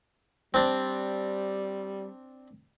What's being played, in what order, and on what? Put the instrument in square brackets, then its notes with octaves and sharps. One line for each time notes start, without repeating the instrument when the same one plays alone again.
[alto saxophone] G3 [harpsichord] C4 D4